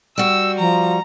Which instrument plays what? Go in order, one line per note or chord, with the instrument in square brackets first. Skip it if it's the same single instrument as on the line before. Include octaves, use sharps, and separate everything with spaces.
[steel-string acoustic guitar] G3 F#4 [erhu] E6
[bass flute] F3 [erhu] A#5